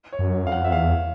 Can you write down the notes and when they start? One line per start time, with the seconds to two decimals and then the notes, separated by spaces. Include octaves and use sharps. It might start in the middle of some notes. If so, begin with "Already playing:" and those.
0.13 C#5
0.19 F#2
0.45 F2 F5
0.52 F#5
0.64 E5
0.72 E2 F5